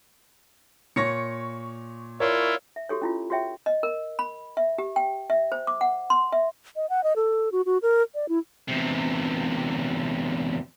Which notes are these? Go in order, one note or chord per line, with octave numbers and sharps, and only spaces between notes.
A#2 C#5 C#6 A#6 C#7
A#2 E4 F4 C#5
E5
F#4 G4 A4 C#5
C#4 E4 F4
F#4 G4 C#5 E5 G5
D#5
A#4
B5
E5
G4
G5
E5
C5
D6
F#5
C6
E5
D#5
F#5
D#5
A4
F#4
F#4
A#4
D5
E4
E2 C3